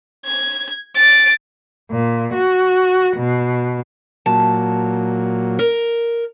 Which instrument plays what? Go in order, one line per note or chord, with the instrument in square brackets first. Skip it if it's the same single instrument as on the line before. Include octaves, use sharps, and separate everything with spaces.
[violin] G#6
A6 D7
[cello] A#2
F#4
B2
[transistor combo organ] A#2 F#3 [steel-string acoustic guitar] A5
[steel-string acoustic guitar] A#4